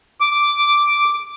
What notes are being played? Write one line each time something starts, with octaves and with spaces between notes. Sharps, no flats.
D6